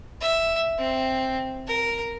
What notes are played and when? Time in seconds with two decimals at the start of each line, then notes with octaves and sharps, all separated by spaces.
0.21 E5
0.78 C4
1.67 A#4